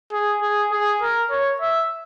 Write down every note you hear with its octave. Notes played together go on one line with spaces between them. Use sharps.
G#4
G#4
G#4
A#4
C#5
E5